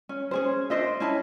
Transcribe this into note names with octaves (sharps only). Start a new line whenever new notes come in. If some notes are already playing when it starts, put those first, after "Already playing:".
C#4
C#4 G#4 C5
D4 C5 D#5 E5
C#4 E4 A5